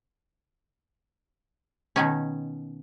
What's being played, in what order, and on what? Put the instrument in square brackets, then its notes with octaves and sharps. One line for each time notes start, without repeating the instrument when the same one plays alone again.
[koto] B2 D#3 C#4